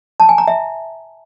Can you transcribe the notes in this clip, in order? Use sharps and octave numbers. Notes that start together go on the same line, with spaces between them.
A5
G#5
A#5
E5